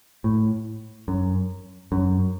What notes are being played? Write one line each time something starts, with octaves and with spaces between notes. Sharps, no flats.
A2
F#2
F#2